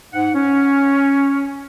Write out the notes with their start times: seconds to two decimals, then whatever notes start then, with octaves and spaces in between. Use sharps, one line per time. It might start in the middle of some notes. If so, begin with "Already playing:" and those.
0.13 G#2 F#5
0.34 C#4